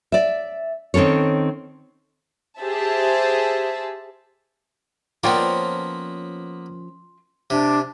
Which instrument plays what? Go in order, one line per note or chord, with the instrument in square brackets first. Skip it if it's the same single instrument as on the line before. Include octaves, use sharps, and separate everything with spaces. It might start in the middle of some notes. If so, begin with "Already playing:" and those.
[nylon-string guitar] D5 E5
D#3 C4 C#4 A4 C#5
[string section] G4 G#4 C5 E5 A5
[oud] F3 C#4 D5 [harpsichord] A#3 B3 [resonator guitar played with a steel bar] F4 A#4 G5
[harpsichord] C3 [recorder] D4